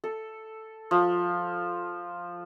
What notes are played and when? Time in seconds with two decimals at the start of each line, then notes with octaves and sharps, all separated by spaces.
0.04 A4
0.91 F3